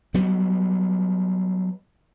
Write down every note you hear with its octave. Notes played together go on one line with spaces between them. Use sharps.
F#3 G3 B3